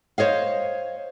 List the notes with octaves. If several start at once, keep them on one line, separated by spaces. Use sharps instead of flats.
C5 C#5 D#5 F5